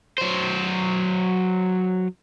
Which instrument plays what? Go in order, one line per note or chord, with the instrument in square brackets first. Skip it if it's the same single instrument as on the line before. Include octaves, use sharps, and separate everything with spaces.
[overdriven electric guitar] F#3 C5